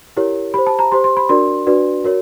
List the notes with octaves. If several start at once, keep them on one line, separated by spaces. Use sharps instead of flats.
E4 G4 A#4 C#5
G4 C5 B5
A5
A#5
G4 C5 C6
C6
B5
D4 F#4 A#4 D5 C6
D4 F#4 B4 D5
F#4 A#4 C#5